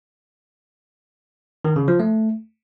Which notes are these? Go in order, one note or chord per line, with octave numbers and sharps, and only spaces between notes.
D#3
C#3
F3
A3